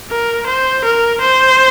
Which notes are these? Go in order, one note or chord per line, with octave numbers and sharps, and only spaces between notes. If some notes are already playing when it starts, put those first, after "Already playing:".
A#4
C5
A#4
C5